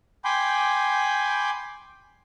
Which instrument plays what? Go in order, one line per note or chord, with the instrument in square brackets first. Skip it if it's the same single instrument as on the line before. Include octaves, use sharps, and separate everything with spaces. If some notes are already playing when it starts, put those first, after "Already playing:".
[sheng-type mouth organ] G5 G#5 B5 C6 D6 G6